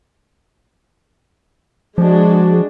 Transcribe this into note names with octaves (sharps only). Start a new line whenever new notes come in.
F3 G#3 D4 F#4